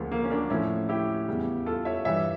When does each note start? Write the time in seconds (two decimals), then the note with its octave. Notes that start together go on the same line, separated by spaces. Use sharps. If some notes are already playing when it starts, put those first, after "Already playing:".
Already playing: D2 C#3 F3 A#3
0.12 A#3
0.24 C#4
0.30 A#3 D4
0.50 A2 F3 C#4 E4
0.89 E4 G4
1.28 E2 C#3 G3
1.66 F4 A4
1.85 C#5 E5
2.05 G2 E3 G3 C#5 E5